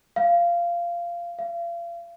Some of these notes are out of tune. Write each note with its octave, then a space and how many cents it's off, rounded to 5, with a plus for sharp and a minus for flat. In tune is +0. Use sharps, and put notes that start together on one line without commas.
F5 -15
F5 -35